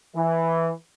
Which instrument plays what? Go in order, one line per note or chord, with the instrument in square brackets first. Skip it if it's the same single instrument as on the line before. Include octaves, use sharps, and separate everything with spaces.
[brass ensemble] E3